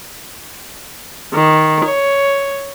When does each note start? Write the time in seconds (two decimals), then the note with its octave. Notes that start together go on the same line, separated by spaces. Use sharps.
1.34 D#3
1.84 C#5